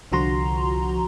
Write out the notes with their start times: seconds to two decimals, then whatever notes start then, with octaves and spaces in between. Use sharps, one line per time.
0.12 C2 D3 F3 F#4 A#5 C6